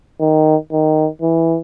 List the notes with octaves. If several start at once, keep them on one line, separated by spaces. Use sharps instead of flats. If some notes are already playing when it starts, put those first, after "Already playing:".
D#3
D#3
E3